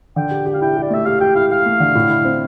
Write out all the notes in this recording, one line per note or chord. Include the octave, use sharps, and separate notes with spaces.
D3 G5
G4
G4
F5
E4 G5
G4
D5
A3 E5
G4 F5
G4 G5
E4 F5
G4 F5
A3
D3
A2
E4
C4